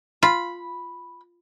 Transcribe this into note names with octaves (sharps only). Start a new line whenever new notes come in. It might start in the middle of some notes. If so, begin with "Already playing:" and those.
F4 B5